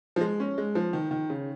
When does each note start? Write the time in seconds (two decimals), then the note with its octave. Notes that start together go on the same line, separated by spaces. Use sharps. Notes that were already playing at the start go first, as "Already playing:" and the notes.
0.16 F3
0.21 G#3
0.40 C#4
0.58 G#3
0.75 F3
0.93 D#3
1.11 D#3
1.30 C#3